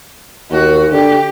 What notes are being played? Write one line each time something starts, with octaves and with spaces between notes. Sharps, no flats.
D#2 F#4
D3 G4